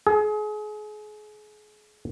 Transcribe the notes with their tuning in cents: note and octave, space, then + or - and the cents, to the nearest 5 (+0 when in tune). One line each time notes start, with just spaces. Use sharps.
G#4 +30